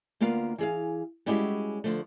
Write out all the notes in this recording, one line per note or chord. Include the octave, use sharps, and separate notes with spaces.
D2 A#3 B3 F4 F5
E3 G#4 F5
G3 G#3 C#4 E4 F#4 G4
D3 F3 A3